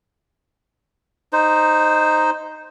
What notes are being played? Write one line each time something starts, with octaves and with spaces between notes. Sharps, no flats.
D#4 C5